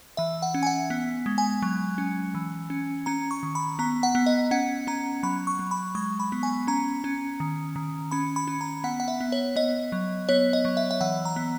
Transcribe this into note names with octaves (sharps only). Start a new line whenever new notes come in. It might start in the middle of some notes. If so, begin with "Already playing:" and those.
E3 E5
F#5
C#4
G#5
F#5
B3
G#3
G#5
F#3
C#4
E3
C#4
C#4 A#5
C#6
D#3
B5
B3 A#5
F#5
B3
D#5
C#4 F#5
C#4 A#5
F#3 B5
C#6
F#3
B5
G#3 C#6
B5
B3
G#5
C#4 A#5
C#4
D#3
D#3
C#4 B5
B5
C#4
A#5
B3 F#5
F#5
E5
B3
C#5
B3 D#5
F#3
B3 C#5
D#5
F#3
E5
E5
E3 F#5
A#5
B3